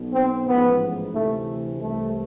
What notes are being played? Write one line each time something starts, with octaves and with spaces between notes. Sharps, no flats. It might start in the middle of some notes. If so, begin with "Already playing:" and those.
Already playing: B1 B2
C4
A1 G#2 F3 B3
D2 C3 E3 A3
C2 C3 E3 A3